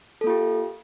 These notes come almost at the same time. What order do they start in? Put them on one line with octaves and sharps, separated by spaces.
A4 A#3 F4 G4